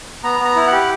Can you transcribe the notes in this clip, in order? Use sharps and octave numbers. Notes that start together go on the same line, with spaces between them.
B3 A#5
B3 A#5
E4
F#5
G4